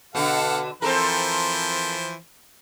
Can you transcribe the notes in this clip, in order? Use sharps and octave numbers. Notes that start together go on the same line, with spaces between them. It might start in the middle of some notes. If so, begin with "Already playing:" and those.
B2 D3 A4 F5 F#5
E3 F3 C4 A4 A#4 C5